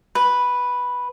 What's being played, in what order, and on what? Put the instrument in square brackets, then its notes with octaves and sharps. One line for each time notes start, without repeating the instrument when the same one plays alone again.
[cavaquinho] B4